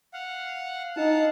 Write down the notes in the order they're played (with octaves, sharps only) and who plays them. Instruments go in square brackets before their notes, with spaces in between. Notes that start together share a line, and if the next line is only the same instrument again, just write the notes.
[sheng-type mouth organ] F5 F#5
[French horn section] D#4 [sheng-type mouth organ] F5 F#5 A5